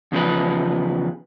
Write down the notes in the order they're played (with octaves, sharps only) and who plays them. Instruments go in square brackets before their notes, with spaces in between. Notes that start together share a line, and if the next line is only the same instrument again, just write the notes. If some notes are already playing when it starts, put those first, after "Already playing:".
[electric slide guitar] E2 C#3 F3 B4